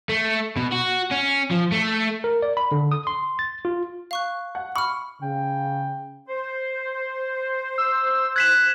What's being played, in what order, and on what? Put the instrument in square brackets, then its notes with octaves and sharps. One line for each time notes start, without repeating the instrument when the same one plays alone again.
[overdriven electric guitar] A3
B2
F#4
C#4
F3
A3
[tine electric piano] A#4
D5
B5
D3
D#6
C6
A6
F4
[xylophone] F5 C#6 F#6
[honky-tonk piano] F#5
[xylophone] B5 F6 [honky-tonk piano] C#6
[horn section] C#3 [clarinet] G5
[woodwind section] C5
[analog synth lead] E6
[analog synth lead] F#6 [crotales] G#6 B6 E7